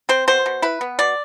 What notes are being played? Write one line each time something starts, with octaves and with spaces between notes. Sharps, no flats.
C4 C5
B2 C5
B2
E4 B4
B3
B2 D5